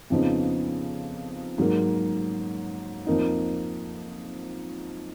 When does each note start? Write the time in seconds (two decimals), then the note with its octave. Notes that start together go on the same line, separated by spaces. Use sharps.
0.10 F2 C#3 F3 B3 D#4
1.58 G#2 F#3 A#3
3.07 F2 F3 A#3 D#4